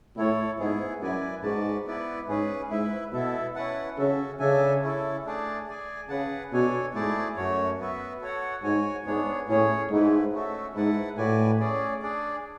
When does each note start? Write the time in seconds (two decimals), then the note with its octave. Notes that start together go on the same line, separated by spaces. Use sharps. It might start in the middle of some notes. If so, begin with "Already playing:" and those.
0.16 A2 E4 A4 C#5
0.59 G#2 B3 E4 G#4
1.01 F#2 E4 B4 D5 G#5
1.43 G#2 F#4 B4 D5 A5
1.86 B3 E4 B4 D5
2.28 G#2 C#4 G#4 B4
2.70 G#2 E4 B4 E5
3.13 B2 B3 E4 A4 E5
3.55 C#4 E4 B4 F#5 A5
3.98 C#3 C#4 F#4 A4 E5
4.39 C#3 D4 A4 E5 G#5
4.82 C#4 E4 A4
5.25 A3 D4 G#4 D5 A5
5.67 G#4 D5 G#5
6.09 C#3 G#4 B4 F#5 A5
6.52 B2 D4 A4 C#5 G#5
6.94 G#2 A3 E4 G#4 D5 A5
7.36 F#2 A3 C#4 F#4 C#5
7.79 B3 F#4 B4 E5
8.22 F#4 A4 C#5 F#5
8.63 G#2 F#4 C#5 G#5
9.05 G#2 B3 D4 G#4 C#5
9.48 A2 C#4 G#4 C#5
9.90 G#2 A3 E4 B4
10.33 A3 C#4 F#4 A4 E5
10.75 G#2 E4 B4 F#5 A5
11.17 A2 F#4 B4 D5 G#5
11.60 C#4 G#4 D5
12.02 D4 G#4 D5